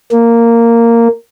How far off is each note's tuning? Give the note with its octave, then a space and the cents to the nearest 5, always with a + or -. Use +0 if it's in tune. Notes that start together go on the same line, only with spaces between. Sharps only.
A#3 -10